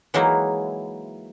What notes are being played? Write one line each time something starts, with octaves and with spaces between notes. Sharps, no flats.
E3 F#3 G#3 A#3 D#4 E4